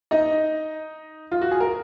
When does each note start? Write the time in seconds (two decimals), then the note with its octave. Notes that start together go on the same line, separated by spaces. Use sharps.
0.11 D#4 D#5
1.32 F4
1.41 F#4
1.51 G#4
1.60 A#4